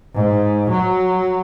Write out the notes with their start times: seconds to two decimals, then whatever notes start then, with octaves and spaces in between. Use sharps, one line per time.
0.14 G#2
0.70 F#3